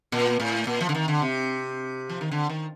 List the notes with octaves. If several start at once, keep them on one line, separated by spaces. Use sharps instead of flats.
A#2
A2
A#2
F3
D3
D#3
D3
C3
F3
D#3
D3
D#3